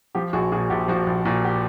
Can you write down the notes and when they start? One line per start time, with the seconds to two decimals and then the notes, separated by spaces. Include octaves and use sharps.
0.15 F3 G4
0.33 A#1 F#4 G#4
0.52 A#2 F#4 G#4
0.70 A#1 G4
0.88 F3 F#4
1.07 A#1
1.25 A#2 F#4
1.45 G4